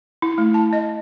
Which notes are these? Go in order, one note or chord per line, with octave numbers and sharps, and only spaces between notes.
E4
A3
A5
D#5